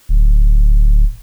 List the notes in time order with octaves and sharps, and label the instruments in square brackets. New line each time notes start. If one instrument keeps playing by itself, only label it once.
[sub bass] D1